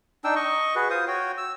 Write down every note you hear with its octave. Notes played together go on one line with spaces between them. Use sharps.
D4 D#4 G5 E6
D#5 C#6
F#4 G#4 B4
F4 C5 D#6
F#4 C#5 G5
E6